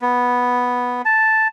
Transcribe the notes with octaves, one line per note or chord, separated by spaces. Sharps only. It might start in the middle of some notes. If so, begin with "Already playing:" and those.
B3
A5